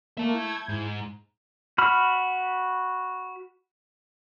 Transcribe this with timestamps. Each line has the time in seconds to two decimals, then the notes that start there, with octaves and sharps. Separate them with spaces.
0.18 A#3 E5 A5
0.34 E4 G6 G#6
0.69 G#2
1.78 F#4 B5 F6